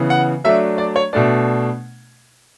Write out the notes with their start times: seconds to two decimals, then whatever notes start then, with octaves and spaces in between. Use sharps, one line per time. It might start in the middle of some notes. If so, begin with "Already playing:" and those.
Already playing: C#3 E3 B3
0.10 F#5
0.44 F#3 A3 D4 E5
0.78 D5
0.96 C#5
1.13 B2 A3 D4 D5